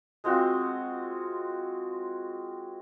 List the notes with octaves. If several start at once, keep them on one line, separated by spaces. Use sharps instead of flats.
G#3 C4 F4 F#4